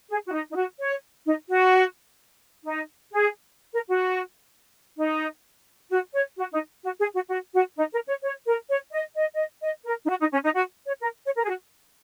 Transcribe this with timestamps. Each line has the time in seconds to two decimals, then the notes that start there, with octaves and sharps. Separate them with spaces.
0.09 G#4
0.25 F#4
0.33 D#4
0.51 D#4
0.56 F#4
0.79 C#5
1.25 D#4
1.49 F#4
2.64 D#4
3.12 G#4
3.74 A#4
3.88 F#4
4.98 D#4
5.90 F#4
6.13 C#5
6.37 F#4
6.52 D#4
6.83 F#4
6.99 G#4
7.15 F#4
7.29 F#4
7.53 F#4
7.77 D#4
7.92 A#4
8.08 C#5
8.23 C#5
8.46 A#4
8.69 C#5
8.93 D#5
9.16 D#5
9.34 D#5
9.62 D#5
9.85 A#4
10.04 D#4
10.09 F#4
10.20 D#4
10.32 C#4
10.44 D#4
10.56 F#4
10.86 C#5
11.01 A#4
11.25 C#5
11.37 A#4
11.44 G#4
11.48 F#4